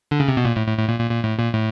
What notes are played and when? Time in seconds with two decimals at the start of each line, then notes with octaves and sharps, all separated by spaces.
0.11 D3
0.20 C#3
0.28 C3
0.37 B2
0.45 A#2
0.56 A2
0.67 A2
0.78 A2
0.88 A#2
0.99 A#2
1.10 A#2
1.24 A2
1.39 A#2
1.53 A2